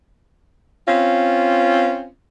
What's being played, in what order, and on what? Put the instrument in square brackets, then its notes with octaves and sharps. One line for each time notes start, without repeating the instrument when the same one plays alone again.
[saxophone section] C4 C#4 F4